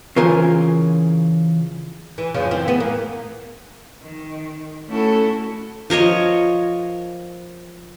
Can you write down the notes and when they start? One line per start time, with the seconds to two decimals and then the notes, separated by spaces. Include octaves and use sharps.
0.16 C#3 E3 F4 A#4 C5 G#5
2.18 E3
2.34 F#2 C#3 F3
2.51 E3 C4
2.68 E3 B3
2.80 A#3
4.03 D#3
4.90 A3 C#4 E4 F#4 A4
5.90 F3 A#4 C#5 D#5